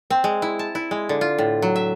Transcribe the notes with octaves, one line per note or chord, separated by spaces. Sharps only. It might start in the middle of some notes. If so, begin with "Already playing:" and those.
C4
G#3
E4
A5
E4
G#3
D3
F4
A2
F#3
E5